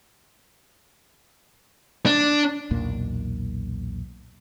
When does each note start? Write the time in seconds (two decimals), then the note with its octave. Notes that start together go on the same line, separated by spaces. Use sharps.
2.06 D4
2.71 B1 E2 A#2 A#3